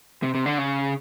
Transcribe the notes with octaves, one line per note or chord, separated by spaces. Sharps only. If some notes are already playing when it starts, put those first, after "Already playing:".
C3
C3
D3
C#3